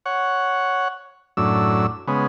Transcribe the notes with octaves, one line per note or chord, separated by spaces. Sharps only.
C#5 F#5
F#2 A2 D4 E6
C#3 G#3 B3